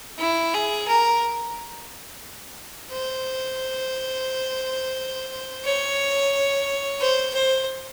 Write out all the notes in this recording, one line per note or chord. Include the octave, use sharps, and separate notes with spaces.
E4
G#4
A#4
C5
C#5
C5
C5